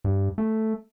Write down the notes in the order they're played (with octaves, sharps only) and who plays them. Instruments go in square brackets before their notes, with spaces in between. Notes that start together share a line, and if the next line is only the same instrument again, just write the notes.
[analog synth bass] G2
A3